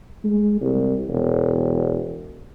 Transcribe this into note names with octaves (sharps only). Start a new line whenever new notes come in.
G#3
C2
E1